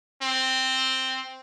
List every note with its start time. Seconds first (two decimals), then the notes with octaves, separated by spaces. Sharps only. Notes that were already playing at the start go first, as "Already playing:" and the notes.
0.22 C4